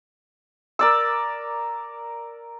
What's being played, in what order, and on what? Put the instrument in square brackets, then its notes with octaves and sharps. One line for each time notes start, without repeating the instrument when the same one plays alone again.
[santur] A#4 D5 E6